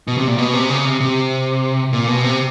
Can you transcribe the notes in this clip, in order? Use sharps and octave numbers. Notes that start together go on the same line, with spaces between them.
B2
C3
A#2
B2
C3
C#3
C3
C3
A#2
B2
C3